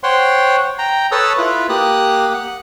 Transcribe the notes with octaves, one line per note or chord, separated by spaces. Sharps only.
C5 C#5 F#5 G5 C6
G5 A#5
A4 B4 C#5 A5 D#6 E6
E4 F4 B4
A#3 G4 D#6 F#6
F#5